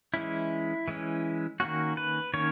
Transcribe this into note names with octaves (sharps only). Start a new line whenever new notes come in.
E3 G#3 C#4 E4
E3 G#3 C#4
D#3 A#3 C#4 F#4
B4
D#3 A#3 C#4 C#5